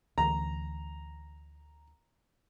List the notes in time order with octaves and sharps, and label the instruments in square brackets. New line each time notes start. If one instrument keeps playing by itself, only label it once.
[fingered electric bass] D2 E3 [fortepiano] A#5